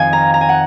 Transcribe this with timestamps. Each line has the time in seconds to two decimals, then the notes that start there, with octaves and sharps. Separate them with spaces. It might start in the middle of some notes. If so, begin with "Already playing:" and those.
Already playing: F2 D#3 F5 G#5
0.13 A#5
0.34 A#5
0.41 G#5
0.49 F#5